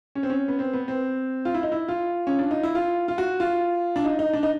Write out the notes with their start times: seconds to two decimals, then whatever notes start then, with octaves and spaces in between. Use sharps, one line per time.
0.15 C#4
0.23 C4
0.30 C#4
0.48 B3
0.59 C4
0.73 B3
0.88 C4
1.45 F4
1.54 E4
1.63 D#4
1.72 E4
1.88 F4
2.27 C#4
2.39 D4
2.51 D#4
2.63 E4
2.75 F4
3.08 F4
3.18 F#4
3.40 F4
3.96 D4
4.05 D#4
4.19 D#4
4.33 D4
4.43 D#4